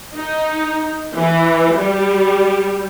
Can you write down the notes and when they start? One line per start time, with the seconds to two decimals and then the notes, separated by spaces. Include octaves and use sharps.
0.15 D#4
1.18 E3
1.79 G3